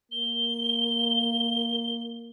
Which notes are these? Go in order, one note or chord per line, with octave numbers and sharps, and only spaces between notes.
A#3 G7